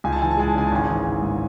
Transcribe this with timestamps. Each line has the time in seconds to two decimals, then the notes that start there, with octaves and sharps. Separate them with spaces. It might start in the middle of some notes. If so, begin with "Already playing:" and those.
0.04 C#2 G#5
0.13 A5
0.21 E3 G#5
0.31 A5
0.37 G#3 G#5
0.49 A5
0.55 C#3 G#5
0.67 A5
0.72 G#1 G#5
0.88 E3
1.06 G#1
1.22 G#2